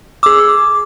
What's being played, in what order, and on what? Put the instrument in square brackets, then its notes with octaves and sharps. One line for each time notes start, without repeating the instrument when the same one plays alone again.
[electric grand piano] G#4 E6 [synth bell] D6